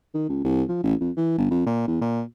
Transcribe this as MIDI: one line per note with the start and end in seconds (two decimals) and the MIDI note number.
0.14 0.25 51
0.29 0.40 37
0.44 0.63 36
0.69 0.80 53
0.84 0.94 33
1.01 1.11 41
1.17 1.36 52
1.38 1.50 31
1.51 1.65 41
1.66 1.84 46
1.88 1.97 40
2.01 2.23 46